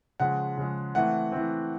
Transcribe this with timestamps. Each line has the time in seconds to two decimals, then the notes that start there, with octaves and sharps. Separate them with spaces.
0.20 C#3 F3 G#3 F#5
0.57 C#3 F3 G#3
0.95 E3 A3 C4 F#5
1.32 E3 A3 C4